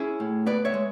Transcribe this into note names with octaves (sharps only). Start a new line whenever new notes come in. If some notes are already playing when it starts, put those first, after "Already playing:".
Already playing: C#4 E4 G#4
A2
B3 B4 D5
C#5 E5
G#3